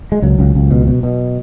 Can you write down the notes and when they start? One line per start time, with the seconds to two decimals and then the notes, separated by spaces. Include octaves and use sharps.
0.12 G#3
0.22 C#2 F#3
0.39 C#2
0.55 C#2
0.71 B2
0.87 B2
1.03 B2